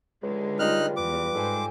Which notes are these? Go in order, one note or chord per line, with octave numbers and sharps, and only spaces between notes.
C#2 D3 G#3
G3 D#4 F4 F6 F#6
E2 B4 D6
G#2 G#3 A4 C5 D5 G#5